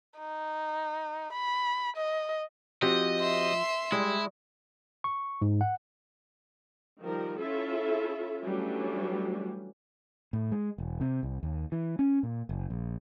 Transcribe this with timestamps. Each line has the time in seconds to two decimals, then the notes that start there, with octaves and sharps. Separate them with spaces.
0.19 D#4
1.33 B5
1.96 D#5
2.82 F3 C4 F#4 G4 D#5
3.20 E5 C6
3.92 G3 G#3 E4
5.04 C#6
5.42 G#2
5.61 F#5
7.01 D#3 F3 G3 A#4
7.40 C#4 E4 F4 A4 E5
8.43 E3 F#3 G3 A3 C#4 D4
10.33 A2
10.52 G#3
10.78 E1
11.01 C3
11.23 C2
11.43 D#2
11.72 E3
11.99 C#4
12.23 A#2
12.49 F#1
12.70 A#1